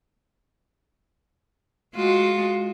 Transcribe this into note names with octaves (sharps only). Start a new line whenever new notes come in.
G#3 F4 F#4